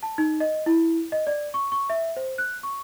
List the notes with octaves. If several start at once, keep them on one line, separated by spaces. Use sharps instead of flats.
A5
D#4
D#5
E4
D#5
D5
C#6
C#6
E5
C5
F#6
C#6